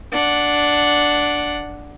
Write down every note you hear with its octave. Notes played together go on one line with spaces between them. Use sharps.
D4 F#5